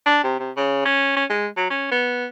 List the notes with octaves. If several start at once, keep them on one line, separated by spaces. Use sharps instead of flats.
D4
C3
C3
C#3
C#4
C#4
G#3
F#3
C#4
B3